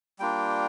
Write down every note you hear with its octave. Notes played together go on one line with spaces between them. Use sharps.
G3 A#3 D4 F4 G5